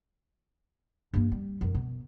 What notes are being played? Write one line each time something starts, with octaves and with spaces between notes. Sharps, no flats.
G2 A#3
G3
E1 F#2
B2